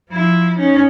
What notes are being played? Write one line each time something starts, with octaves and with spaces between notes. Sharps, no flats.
F3 E4
C#4 D#4